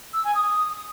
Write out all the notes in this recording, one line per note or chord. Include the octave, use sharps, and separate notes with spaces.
E6
G#5
D#6